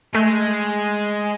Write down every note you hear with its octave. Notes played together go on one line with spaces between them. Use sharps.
G#3 A3